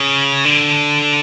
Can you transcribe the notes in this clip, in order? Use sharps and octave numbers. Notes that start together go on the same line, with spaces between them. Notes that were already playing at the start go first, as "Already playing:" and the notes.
Already playing: C#3
D3